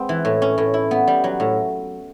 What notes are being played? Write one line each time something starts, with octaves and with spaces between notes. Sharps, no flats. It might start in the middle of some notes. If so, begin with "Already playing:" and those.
Already playing: G#3 B3 C4
E3
A2
C#4
A2
E4
B3
G3
F#3
A2